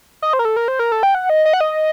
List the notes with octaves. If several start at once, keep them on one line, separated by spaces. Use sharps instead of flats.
D#5
C5
A#4
A4
A#4
C5
A#4
A4
G5
F#5
D#5
D#5
F#5
D#5